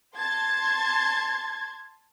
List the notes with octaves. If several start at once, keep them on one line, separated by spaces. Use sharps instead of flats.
A5 C6 G#6 A6